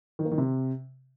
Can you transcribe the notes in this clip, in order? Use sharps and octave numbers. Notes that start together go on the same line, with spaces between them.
D#3
A#3
D#3
C3